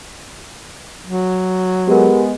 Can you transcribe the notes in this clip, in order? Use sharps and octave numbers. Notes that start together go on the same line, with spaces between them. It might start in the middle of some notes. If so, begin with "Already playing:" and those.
F#3
G#3 B3 G4 A#4